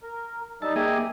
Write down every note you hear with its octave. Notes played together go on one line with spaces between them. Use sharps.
A#4
G3 D#4 E5 A5
A#3 G4 G#4 D#5 E5